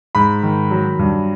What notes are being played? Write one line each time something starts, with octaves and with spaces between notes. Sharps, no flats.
G#2 B5
D#3
F#3
G2